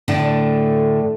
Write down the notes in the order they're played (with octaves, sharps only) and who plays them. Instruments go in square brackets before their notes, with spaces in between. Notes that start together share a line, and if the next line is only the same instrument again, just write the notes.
[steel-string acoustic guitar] A2 D3 A3